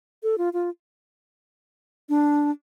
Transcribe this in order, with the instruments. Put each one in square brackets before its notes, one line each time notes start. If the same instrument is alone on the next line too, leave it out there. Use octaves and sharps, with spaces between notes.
[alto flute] A4
F4
F4
D4